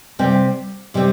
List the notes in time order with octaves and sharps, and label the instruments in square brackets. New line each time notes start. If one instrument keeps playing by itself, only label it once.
[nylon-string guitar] C3 G3 C4 G4
C3 G3 C4